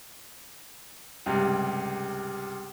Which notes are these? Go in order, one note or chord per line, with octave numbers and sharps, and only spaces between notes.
C#2 G2 C3